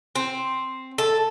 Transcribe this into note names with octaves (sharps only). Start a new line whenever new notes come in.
C4
A4